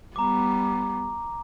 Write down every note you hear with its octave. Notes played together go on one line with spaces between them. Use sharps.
G3 B3 A#5 D6